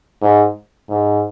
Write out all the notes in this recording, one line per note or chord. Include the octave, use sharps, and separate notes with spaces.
G#2
G#2